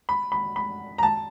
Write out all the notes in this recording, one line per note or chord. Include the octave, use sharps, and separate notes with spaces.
B5
B5
B5
A#5
A5